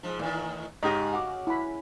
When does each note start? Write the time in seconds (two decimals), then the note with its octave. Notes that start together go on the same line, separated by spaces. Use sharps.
0.03 G#2 F3
0.19 A2 D#3 E3
0.83 G#2 C#3 G4 D#5
1.13 F#4 D6
1.47 E4 F#5 B5